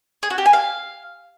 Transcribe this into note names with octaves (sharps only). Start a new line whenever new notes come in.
G#4
F#4
G4
G#5
F5